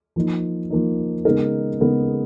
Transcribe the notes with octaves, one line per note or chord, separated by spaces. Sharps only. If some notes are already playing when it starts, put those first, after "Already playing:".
F3 A#3 D#4
F3 A#3 D#4
C#3 G#3 B3 D#4 A#4
C#3 G#3 B3 D#4 A#4